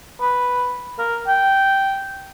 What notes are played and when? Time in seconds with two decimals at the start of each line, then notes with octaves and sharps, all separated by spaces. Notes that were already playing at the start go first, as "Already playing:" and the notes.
0.21 B4
0.98 A#4
1.27 G5